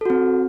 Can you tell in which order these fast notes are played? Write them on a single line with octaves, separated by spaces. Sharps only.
A4 F#4 C4